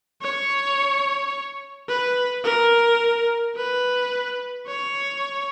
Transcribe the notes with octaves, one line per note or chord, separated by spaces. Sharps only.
C#5
B4
A#4
B4
C#5